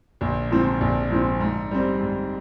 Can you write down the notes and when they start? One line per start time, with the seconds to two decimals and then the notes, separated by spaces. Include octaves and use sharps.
0.21 A#1
0.51 G#2 F3 C4
0.81 A#1
1.11 G#2 F3 C4
1.41 G#2
1.71 G3 C4
2.01 G#2